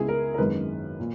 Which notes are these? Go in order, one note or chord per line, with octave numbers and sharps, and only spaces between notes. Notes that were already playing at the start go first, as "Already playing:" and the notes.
Already playing: C#2 C#3 G#3 B3 E4 G#4
A#4
A#4
G#1 F#2 D#3 G#3 B3 B4
A#2